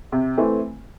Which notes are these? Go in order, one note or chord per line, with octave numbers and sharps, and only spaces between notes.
C3
E3 A3 C4